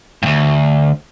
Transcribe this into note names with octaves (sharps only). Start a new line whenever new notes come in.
D2 G2